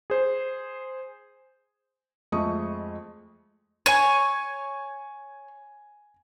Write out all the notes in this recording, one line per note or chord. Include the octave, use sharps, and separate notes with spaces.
G#4 C5
F2 G#3 A3 D#5 C#6 D#6
C#5 G#5 G#6 D#7